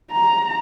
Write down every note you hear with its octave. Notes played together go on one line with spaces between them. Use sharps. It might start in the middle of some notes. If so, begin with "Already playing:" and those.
A#5